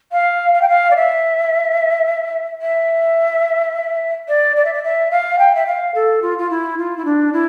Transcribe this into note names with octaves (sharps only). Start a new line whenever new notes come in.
F5
F5
G5
F5
D5
E5
E5
D5
D5
E5
D5
E5
F5
G5
E5
F5
A4
F4
F4
E4
F4
E4
D4
E4